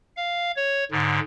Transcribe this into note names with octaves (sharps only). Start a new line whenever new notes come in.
F5
C#5
G#2 D3